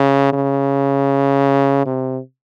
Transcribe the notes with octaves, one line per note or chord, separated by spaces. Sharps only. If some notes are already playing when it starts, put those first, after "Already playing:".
Already playing: C#3
C#3
C3